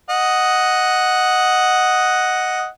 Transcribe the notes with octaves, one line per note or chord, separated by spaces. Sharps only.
D#5 F#5